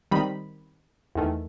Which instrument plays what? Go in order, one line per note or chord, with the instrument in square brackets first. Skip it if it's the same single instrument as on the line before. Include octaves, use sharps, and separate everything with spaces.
[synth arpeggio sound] D#3 G3 C4 D#4 B5
E2 D#3 A3